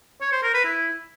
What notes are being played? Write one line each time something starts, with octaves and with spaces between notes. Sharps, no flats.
C#5
C5
A#4
B4
E4